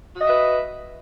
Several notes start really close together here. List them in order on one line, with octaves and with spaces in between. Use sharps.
F#4 D#5 E5 B4